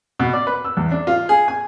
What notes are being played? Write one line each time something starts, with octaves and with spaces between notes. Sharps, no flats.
B2
D5
B4
E6
E2
D4
F4
G#4
G#5